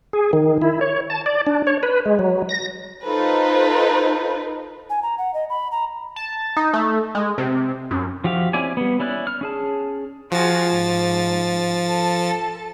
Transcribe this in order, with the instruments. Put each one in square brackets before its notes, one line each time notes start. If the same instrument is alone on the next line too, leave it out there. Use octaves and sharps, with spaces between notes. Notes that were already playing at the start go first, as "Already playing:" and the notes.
[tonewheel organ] G#4
D#3
E4
C#5
A5
D5
D4
C#5
B4
G#3
F#3
A#6
[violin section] D#4 F4 A4 B4 C5
[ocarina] G#5
A#5
F#5
D#5
B5
A#5
[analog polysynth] A5
D#4
A3
G#3
C3
F#2
[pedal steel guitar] F3 F#4 G4 E5 F5
C4 C#4 E4 D5 G#5
G3 B3
C#4 E4 D5 F#6
F6
C#4 G#4 A5
[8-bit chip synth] F3 A6 [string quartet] F4 F#4 G#4
[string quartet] G#2
A4 A5